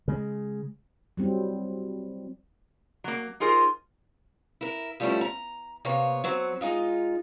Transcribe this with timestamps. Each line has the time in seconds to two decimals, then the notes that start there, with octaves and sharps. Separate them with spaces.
0.08 C#3 G#3
1.17 F#3 G3 C4 E4
3.04 F#3 A#3
3.40 D#4 F4 G#4 A#4 C5
4.61 E4 A#4
5.00 F3 G3 A3 B3 C#4 E4
5.21 A#5
5.85 C3 A#3 B3 C#5 F5
6.24 F#3 C4 F#4
6.61 G#3 D#4 F4